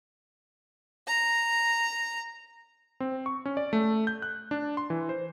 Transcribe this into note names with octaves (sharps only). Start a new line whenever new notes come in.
A#5
C4
C#6
C#4
D5
A3
G6
F#6
D4
C6
E3
C5